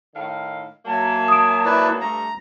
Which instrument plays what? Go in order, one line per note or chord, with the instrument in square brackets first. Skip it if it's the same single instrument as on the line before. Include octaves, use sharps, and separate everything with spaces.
[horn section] A2 D#3 F5
[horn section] F#3 A#3 [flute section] E5 G#5 A5
[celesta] D#6 D7
[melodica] E4 B4 D5
[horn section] G2 A3 [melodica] A#5